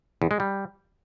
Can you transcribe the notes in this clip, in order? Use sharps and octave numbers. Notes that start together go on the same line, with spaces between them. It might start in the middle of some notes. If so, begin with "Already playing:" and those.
E2
G#3
G3